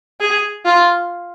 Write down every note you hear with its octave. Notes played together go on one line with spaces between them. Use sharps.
G#4
F4